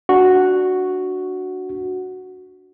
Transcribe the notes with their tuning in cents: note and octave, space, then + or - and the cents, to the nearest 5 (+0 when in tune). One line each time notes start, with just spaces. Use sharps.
D4 +0 F#4 +0